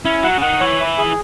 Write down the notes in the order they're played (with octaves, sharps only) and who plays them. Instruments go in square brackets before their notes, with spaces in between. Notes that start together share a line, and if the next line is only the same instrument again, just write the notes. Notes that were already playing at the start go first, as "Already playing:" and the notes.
[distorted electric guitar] C#4 [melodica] E4
[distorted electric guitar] F#3 [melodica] F#5
[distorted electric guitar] C#3
[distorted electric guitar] D#3 [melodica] F#5
[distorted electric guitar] E3 [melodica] C#5
[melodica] E4
G#4